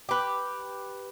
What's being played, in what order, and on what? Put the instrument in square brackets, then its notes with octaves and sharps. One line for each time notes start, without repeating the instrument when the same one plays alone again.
[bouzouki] G4 B4